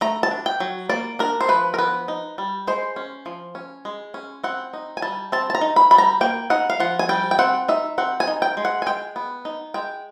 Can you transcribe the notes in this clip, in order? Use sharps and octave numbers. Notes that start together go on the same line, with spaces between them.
A3 A#5
A5
D4
G5
F#3
A#3 D5
D4 A#4
C5
F3 B4
A#4
B3 B4
D#4
G3
G#3 C5
C#4
F3
C#4
G#3
C#4
C4 F#5
D#4
G#5
G3 A5
C4 A5
A5
A#5
D#4
B5
G3 B5
A#5
A#3 G5
D#4 F#5
F5
F3 F#5
G#5
G3 G5
G5
C4 F#5
D#4 E5
C4 F#5
G#5
D#4
G5
G#3
F#5
G#5
G#3 G5
B3
D#4
G#3 G5